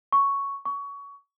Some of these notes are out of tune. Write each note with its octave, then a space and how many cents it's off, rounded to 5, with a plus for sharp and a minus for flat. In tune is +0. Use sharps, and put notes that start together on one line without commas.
C#6 +5
C#6 +25